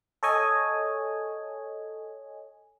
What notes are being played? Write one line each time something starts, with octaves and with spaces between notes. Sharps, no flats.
A4 C#5 D#5 G#5